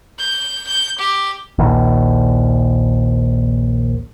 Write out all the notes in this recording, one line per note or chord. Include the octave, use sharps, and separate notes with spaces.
G6
G6
G4
A#1 D#2